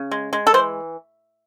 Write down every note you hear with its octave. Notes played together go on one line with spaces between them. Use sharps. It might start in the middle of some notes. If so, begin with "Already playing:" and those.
Already playing: C#3
G#3
G#3
A4
E3 C5